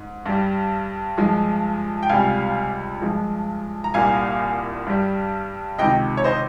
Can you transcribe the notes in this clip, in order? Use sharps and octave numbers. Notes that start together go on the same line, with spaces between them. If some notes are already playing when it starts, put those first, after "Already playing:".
Already playing: G#2
G2 G3
G2 F3 G#3
G5
C#2 C3 G3 F5 G#5
G2 F3 G#3
A#5
C2 A#2 G3 F5 G#5
G2 G3
C#2 C3 D#3 D#5 G5
C#5
C5 D#5